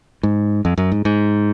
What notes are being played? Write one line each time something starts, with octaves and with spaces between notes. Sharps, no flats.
G#2
F2
F#2
G#2
G#2